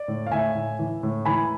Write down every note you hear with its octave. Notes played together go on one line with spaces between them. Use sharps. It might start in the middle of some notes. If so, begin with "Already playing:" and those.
Already playing: D5
A2
F5
A2 E5 G#5
A2
E3
A2
E3 G#5 B5